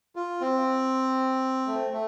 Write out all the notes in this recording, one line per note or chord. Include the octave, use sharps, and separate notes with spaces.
F4
C4
A3
A3